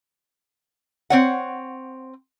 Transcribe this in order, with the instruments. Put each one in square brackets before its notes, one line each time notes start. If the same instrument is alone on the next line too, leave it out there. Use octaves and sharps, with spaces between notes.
[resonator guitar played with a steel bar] C4 C#5 F#5